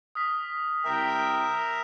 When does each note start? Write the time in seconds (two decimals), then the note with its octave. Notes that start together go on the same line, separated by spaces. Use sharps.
0.15 D#6 F6 B6
0.85 C2 A#4 C5 E5 G5